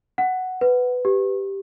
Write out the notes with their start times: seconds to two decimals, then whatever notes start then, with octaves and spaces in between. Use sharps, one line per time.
0.18 F#5
0.61 B4
1.05 G4